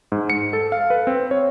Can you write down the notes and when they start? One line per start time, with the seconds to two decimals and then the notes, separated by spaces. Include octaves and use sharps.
0.12 G#2
0.30 C#7
0.53 A4
0.72 F5
0.90 B4
1.07 C4
1.31 C#5